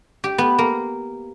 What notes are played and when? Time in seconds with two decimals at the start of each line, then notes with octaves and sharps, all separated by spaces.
0.24 G4
0.38 B3
0.59 A#3